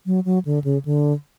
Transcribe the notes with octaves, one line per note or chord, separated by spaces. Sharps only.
F#3
F#3
D3
C#3
D3